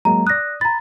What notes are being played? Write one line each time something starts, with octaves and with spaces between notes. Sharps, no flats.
F#3 G#3 A#3 A#5
D5 D#6 F#6 A#6
A#5 B5 A6